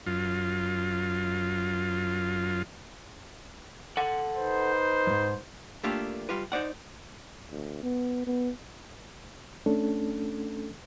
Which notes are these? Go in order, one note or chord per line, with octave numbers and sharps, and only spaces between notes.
F#2 F4
A4 F#5
D#4 B4 C5
F2 G#2
A3 A#3 D4 F4 G4 A4
G3 F4 G4 B4
D#4 C5 D5 F#5
D2
B3
B3
A3 C#4 D4 A4